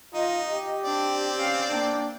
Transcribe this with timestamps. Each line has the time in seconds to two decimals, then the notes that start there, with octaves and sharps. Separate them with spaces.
0.14 D#4 F4 D#5
0.48 G4
0.84 C4 D4 D5
1.36 C#4 F5
1.70 A#3 D4 G5